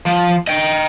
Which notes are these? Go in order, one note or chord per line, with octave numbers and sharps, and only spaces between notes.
F3
D#5 G5